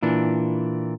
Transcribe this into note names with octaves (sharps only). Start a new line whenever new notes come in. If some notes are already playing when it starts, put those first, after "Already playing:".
A#2 E3 D4